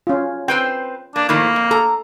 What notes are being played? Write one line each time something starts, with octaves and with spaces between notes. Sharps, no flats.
C#4 F4
C4 B4 C5 G5
A#3 D4
A2 D#3 F3 A#3
F2
A4 A#5